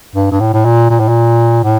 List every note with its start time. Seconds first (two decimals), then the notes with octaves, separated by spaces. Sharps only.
0.15 G2
0.32 G2
0.40 A2
0.53 A2
0.65 A#2
0.90 A#2
1.00 A2
1.09 A#2
1.64 A2